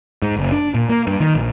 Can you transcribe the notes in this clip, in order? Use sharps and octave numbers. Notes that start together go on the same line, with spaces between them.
G#2
F#1
D4
A#2
A#3
G2
D#3
A#1